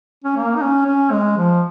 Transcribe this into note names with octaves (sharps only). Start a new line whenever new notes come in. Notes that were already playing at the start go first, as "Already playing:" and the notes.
C#4
A#3
D#4
C#4
C#4
G#3
F3